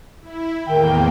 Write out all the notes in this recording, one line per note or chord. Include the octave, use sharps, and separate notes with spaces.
E4
E2 A2 D#3 A#3 G5